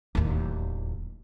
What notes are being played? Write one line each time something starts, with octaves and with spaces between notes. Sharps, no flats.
D1 D#2